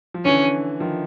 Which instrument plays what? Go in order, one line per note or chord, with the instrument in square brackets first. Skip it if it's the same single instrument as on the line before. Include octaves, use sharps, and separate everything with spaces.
[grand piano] F3
[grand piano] D3 E3 [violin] C#4
[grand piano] D#3 F3